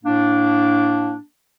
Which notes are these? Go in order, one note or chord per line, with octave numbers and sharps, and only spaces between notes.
A2 A#3 D4